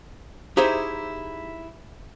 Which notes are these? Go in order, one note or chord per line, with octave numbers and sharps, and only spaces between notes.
D#4 E4 G4 G#4 C5 E5